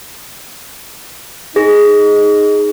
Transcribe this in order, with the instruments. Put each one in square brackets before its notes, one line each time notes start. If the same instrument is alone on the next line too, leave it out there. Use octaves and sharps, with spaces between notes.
[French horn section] D#4 [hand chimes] G#4 A#6